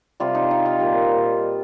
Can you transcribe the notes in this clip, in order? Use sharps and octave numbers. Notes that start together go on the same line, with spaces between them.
C3 G3 F4
D#4
D#4
F4
A#2 G3